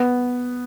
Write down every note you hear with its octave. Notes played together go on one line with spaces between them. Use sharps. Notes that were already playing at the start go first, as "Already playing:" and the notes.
Already playing: B3